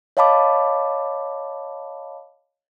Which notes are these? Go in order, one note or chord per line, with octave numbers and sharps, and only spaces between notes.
C#5 D#5 F5 A5 B5 D6